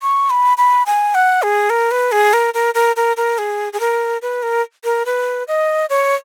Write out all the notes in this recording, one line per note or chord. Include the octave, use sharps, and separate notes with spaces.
C#6
B5
B5
G#5
F#5
G#4
A#4
B4
G#4
A#4
A#4
A#4
A#4
A#4
G#4
G#4
A#4
B4
A#4
A#4
B4
D#5
C#5